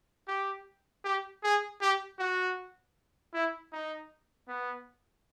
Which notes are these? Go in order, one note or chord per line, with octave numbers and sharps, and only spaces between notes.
G4
G4
G#4
G4
F#4
E4
D#4
B3